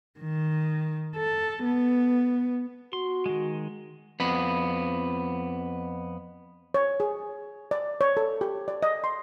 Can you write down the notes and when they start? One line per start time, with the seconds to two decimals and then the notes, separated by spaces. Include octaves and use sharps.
0.20 D#3
1.16 A4
1.64 B3
2.93 F#4 C6
3.26 D#3 G#3
4.20 F2 B3 B5
6.74 C#5
7.00 G#4
7.71 D5
8.01 C#5
8.17 A4
8.41 G4
8.68 D5
8.83 D#5
9.04 C6